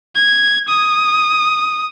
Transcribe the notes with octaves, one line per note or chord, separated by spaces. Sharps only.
G#6
D#6